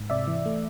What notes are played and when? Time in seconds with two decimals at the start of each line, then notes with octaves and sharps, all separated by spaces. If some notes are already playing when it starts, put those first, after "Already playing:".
Already playing: G#2
0.10 C3 D5 E5
0.28 E3
0.46 A3